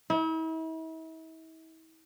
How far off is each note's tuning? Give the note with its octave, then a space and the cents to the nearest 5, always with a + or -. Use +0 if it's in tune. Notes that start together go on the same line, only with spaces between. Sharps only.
E4 -40